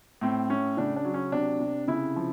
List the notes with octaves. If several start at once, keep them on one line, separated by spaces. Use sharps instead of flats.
A2 C4
A2 C#4
C#3 D4
D4
F#3
C#4
C3 D4
C3
C#3 E4
F3